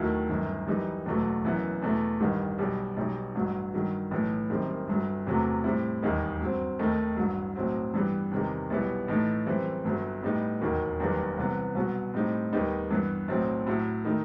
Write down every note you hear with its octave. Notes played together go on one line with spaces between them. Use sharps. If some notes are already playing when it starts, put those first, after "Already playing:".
Already playing: D#2 D#3 F#3 A3 E4
G1 F#2 D#3
F#2 E3 G3 D#4
F#1 E2 B2 F#3 A3
F#1 F#2 E3 B3 E4
E2 B2 A3 E4
A1 G2 D#3 G3
B1 B2 G3
B1 B2 G3 D#4
A1 G2 F#3
G2 D#3 F#3
B1 A2 E3
F#2 D#3 G3 C4
G1 G2 F#3
E1 E2 C3 F#3 A3
A2 G3 C4 E4
E1 D#2 D#3 G3 D#4
G2 F#3 C4
D#2 D#3 A3 D#4
A1 G2 F#3
B1 A2 F#3 C4
G2 E3 G3 B3
E2 C3 D#3 G3
B1 B2 G3 B3 E4
A2 E3 A3 D#4
F#2 E3 G3 C4 E4
G1 G2 F#3 B3
A2 G3 B3 D#4
E1 D#2 D#3 F#3
F#1 E2 D#3 G3 B3
C2 C3 E3 B3
C2 B2 F#3 B3
A2 G3 C4 D#4
D#2 D#3 G3 B3 D#4
G2 E3 B3
B1 A2 F#3 C4
A2 F#3 A3 E4
D#3 A3 D#4